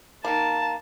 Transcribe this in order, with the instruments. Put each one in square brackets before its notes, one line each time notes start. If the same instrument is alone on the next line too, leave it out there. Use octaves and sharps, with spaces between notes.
[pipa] D#3 A#3 [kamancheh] A5